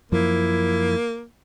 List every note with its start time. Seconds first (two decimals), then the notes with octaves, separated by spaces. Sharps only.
0.12 F#2 F3 A#3 E4